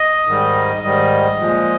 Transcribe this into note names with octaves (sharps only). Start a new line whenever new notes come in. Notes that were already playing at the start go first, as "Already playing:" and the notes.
Already playing: D#5
G#2 D#3 G3
G#2 D#3 G3 D#5
A#2 F3 G#3